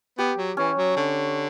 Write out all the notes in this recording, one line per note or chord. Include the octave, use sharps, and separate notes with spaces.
B3 G4
F#3
E3 C#4
F#3
D3 C#4